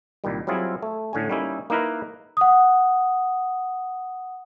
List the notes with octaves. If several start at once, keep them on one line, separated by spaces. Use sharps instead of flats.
C2 A#2 D#3 G3
F#3 G3 C4 E4 F4 G#4
A3
A2 D3 C#4 G#5
G3 A#3 C#4 D#4 E4
A#3 D#4 E4 A#4 B4
F#5 D#6